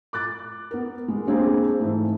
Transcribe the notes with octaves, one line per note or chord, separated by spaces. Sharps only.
D6 F#6 A6
B3 A#4
G#3
G#3 A#3 C4 D4 G#4 C5
G#2 E3 A3